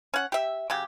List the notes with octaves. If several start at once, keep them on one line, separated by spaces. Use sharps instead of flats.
C#4 F#5
G4 E5
C#3 F#3 G4